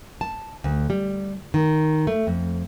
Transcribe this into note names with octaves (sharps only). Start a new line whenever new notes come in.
A5
D2
G3
D#3
A3
F2